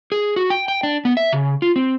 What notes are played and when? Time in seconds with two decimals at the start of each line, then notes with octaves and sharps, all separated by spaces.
0.12 G#4
0.36 F#4
0.50 G5
0.68 G5
0.83 D4
1.05 B3
1.17 E5
1.33 C#3
1.62 F4
1.76 C4